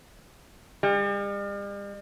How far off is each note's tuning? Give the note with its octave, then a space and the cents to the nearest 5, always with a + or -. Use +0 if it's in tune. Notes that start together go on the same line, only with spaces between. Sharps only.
G3 +45